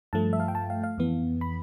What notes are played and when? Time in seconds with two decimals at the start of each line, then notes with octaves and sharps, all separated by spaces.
0.13 G2 F3 A3 A5
0.33 E5
0.40 F5
0.48 G5
0.55 A5
0.70 F5
0.84 F5
0.98 F2 E3 B3
1.41 B5